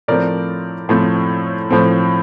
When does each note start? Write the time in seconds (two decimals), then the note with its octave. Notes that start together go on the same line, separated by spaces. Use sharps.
0.08 A2 F3 A3 C4 A#4 D5
0.89 A2 F3 A3 C4
1.70 A2 F3 A3 C4